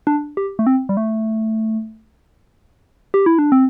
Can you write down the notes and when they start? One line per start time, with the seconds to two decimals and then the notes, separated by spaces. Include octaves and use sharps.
0.07 D4
0.37 G4
0.59 A3
0.67 C4
0.89 G3
0.97 A3
3.14 G4
3.26 E4
3.39 D4
3.52 C4